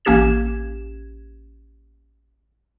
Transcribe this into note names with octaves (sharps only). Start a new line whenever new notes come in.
A1 A#3 C#4 G4 G#6 E7